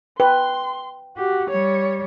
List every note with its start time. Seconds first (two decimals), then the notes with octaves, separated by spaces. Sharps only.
0.20 B4 G5 C6
1.17 F#4 G4
1.50 G3 C#5